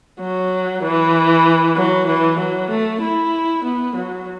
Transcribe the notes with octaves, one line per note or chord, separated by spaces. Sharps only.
F#3
E3
F#3
E3
F#3
A3
E4
B3
F#3